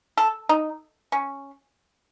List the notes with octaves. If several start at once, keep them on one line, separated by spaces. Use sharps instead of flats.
A4
D#4
C#4